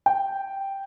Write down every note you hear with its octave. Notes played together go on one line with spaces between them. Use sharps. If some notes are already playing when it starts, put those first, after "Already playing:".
G5